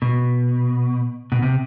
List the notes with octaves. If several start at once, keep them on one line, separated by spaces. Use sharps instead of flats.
B2
B2
C3